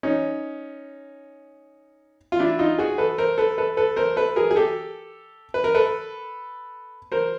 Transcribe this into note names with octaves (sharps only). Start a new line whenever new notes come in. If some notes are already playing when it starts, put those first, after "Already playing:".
C#4 D#4
F4
D4 E4
D#4 F4
F#4 G#4
A4 B4
A#4 C5
A4 B4
A4 B4
A4 B4
A#4 C5
A4 B4
G#4 A#4
G#4
G4 A4
B4
A#4
A4 B4
A#4 C5